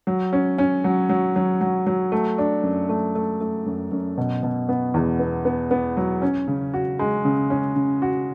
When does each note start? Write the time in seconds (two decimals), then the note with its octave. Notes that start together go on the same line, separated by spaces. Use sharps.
0.07 F#3
0.33 C#4
0.58 C#4
0.84 F#3
1.09 F#3
1.36 F#3
1.61 F#3
1.87 F#3
2.12 A3
2.38 D4
2.63 F#2
2.89 A3
3.15 A3
3.41 A3
3.66 F#2
3.91 F#2
4.17 B2
4.43 B2
4.69 B3
4.94 E2
5.19 B3
5.45 B3
5.71 B3
5.97 F#3
6.22 C#4
6.48 C#3
6.74 F#4
6.99 G#3
7.25 C#3
7.50 C#4
7.76 C#3
8.02 F#4